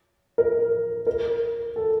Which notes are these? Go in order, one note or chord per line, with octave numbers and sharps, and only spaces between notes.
A#4
A#4
A4